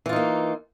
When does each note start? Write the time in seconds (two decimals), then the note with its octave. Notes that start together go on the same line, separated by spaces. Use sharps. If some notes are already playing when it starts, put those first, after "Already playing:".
0.06 E3
0.09 F4
0.13 D#4
0.16 A#3